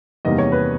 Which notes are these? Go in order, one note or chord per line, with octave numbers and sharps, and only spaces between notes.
E2 C3 D#3 G3 A#3 D#5
C#5
B4